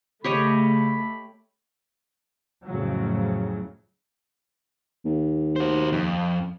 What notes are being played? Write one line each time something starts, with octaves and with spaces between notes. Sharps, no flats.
C#3 A3 G4 C#5 D#5 B5
F2 A2 C#3 F3 F#3
D#2
F#4 C5
F2